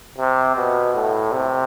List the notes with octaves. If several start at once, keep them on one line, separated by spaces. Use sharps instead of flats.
C3
B2
A2
C3